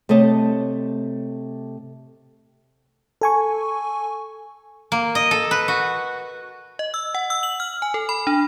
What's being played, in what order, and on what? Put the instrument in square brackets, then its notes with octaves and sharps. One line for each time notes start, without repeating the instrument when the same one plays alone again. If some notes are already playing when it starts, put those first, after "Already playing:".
[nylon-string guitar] C3 A3 C#5 D#5 A5
[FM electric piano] A4 G#5 C#6
[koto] A#3
D#5
A4
B4
F#4
[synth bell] D#5
E6
F#5
E6
F#7
F6
G#5
A4
B5
D4